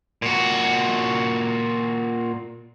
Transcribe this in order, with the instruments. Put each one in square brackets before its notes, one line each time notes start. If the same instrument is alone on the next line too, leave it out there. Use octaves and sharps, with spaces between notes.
[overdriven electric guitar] A#2 F#4